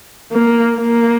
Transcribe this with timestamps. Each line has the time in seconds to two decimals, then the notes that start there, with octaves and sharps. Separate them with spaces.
0.32 A#3
0.78 A#3